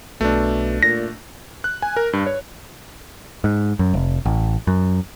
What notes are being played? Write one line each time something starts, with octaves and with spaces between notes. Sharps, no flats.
B1 B2 A3 D4
A#2 A#6
F#6
G#5
A#4
G2
C#5
G#2
F#2
F1
A1
F#2